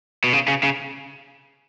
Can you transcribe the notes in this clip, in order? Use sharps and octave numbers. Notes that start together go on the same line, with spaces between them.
B2
C#3
C#3
C#3